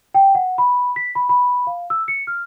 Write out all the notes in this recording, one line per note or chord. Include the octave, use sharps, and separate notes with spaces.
G5
F#5
B5
B6
B5
B5
F5
E6
C#7
F6